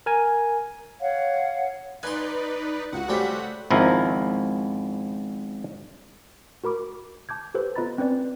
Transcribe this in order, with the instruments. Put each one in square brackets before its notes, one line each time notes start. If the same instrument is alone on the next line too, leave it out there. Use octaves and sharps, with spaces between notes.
[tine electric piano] A#4 G#5
[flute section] C#5 F5 F#5
[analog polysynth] D#4 B4 D5 [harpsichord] G#5 C6 [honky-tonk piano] F#6
[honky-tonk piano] C#2 [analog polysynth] F#4 F#5
[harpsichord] C#3 G3 C4 [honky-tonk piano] A3 G4 B6
[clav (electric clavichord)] G#1 C#2 F3 E4 A#4
[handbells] F#4 A#4 B5 D6
A5 D6 G6 G#6
G4 A4 B4 C5
B3 F4 D#5 A#5 B5 A6
C4 C#4 B4 D5